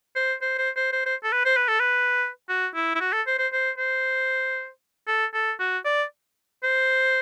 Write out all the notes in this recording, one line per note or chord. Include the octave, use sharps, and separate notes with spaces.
C5
C5
C5
C5
C5
C5
A4
B4
C5
B4
A4
B4
F#4
E4
E4
F#4
A4
C5
C5
C5
C5
A4
A4
F#4
D5
C5